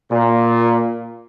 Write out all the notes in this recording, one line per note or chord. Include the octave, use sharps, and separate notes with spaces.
A#2